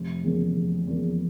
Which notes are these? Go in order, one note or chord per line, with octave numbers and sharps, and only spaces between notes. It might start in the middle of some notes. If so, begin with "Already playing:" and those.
Already playing: F1
E2 C#3 F3 A#3
F1
E2 C#3 F3 A#3